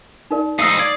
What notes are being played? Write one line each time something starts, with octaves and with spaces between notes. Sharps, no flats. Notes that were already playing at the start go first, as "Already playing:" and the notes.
D#4 A#4 D5
F2 D#4 F5 D#6 E6 C7 D#7
D5 G#6